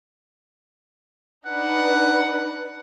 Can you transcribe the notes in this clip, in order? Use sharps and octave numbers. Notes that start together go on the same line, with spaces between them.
D4 D#4 B4 F#5